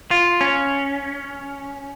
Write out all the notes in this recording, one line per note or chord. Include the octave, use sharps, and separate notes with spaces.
F4
C#4